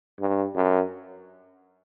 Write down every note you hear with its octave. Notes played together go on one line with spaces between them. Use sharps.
G2
F#2